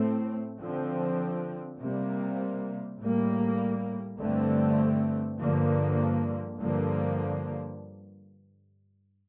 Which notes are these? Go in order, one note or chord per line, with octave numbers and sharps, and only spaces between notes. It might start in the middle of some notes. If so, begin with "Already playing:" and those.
Already playing: A2 A3 C4
D3 F3 C4
C3 G3 A#3
A2 G3 A#3
G2 D3 A3 C4
G2 D3 F3 A#3
G2 D3 F3 A#3